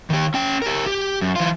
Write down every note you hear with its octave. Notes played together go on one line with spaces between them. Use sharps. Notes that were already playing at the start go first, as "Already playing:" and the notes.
D#3 G4
C#4 G5
G4 A#4
G4
F#2
E3 F4